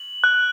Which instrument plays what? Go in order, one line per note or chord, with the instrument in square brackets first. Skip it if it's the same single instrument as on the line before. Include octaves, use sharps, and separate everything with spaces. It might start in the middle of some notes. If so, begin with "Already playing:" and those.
Already playing: [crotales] F#7
F#6